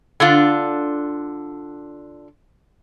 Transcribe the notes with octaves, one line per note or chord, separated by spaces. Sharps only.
D3 D4 F4